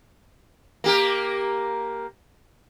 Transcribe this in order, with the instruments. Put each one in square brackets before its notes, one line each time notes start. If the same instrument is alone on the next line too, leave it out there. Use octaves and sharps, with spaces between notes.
[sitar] A#3 G4 A#4